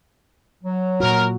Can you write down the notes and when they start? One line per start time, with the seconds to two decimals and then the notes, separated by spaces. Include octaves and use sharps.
0.64 F#3
1.00 A#2 F#4 A#4